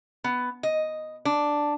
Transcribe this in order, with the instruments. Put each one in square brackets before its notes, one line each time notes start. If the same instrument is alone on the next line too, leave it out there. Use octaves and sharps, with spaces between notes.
[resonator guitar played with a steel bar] B3
D#5
D4